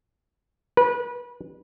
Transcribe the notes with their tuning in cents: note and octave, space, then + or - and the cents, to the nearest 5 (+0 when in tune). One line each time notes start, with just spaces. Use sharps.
B4 -30